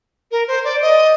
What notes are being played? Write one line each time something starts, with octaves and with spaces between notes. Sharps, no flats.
A#4
C5
D5
D#5